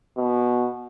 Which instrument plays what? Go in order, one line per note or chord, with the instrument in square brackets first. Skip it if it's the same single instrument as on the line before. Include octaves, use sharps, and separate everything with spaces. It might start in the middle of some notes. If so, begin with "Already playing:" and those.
[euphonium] B2